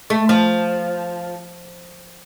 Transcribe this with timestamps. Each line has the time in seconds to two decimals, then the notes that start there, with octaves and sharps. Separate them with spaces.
0.10 A3
0.29 F3